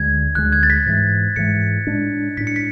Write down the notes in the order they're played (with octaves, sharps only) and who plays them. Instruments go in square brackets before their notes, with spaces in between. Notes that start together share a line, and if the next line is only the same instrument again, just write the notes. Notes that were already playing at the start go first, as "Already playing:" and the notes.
Already playing: [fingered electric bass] D2 D3 G#3 [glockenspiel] G#6
[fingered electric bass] D2 D3 G#3 [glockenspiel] F#6
[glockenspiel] G#6
A6
B6
[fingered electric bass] G#2 E3 G#3
[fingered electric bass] G#2 E3 G#3 [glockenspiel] C#7
[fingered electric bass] A2 G#3 D4
[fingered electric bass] A2 G#3 D4 [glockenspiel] B6
[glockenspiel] C#7
B6